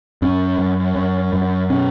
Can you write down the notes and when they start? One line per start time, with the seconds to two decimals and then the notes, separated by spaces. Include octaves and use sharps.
0.22 F#2 C#4
0.58 F#2
0.96 F#2
1.33 F#2
1.70 B2 C#4